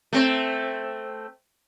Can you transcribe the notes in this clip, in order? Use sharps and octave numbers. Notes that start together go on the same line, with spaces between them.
A3 C4